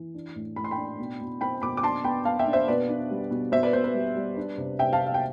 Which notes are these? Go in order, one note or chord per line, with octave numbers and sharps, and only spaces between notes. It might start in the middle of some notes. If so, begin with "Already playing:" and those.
Already playing: E3
D4
A2
A2 B5
C6
G5 B5
D4
B2
B2
C4 G5 B5
B2 B5 D6
D6
D4 A5 C6
B3 G5 B5
B3 F5 A5
E5 G5
D4
C5 E5
B2 B4 D5
D4
G3
B2
B2 C5 E5
B4 D5
B2 C5
B4
G3
G3
D4
C3
C3 E5 G5
F5 A5
C3
F5
G5